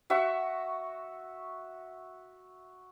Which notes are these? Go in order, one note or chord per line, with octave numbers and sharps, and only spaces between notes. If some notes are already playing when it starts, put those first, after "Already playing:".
F#4 E5 C#6